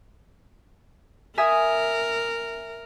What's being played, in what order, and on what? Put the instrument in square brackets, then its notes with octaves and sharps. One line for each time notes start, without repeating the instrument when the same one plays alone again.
[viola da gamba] A#4 [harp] E5 G#5 D#6